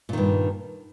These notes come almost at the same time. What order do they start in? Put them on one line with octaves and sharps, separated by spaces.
A#2 D#3 G2